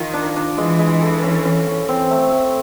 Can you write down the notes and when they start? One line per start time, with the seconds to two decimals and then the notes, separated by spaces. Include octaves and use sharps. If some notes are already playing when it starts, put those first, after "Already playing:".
Already playing: D#3 F4
0.14 D4
0.36 D4
0.58 E3 G#3
0.79 G#3
1.02 A4
1.23 C#4
1.45 C#4
1.67 C#4
1.88 C4
2.11 A3
2.32 A3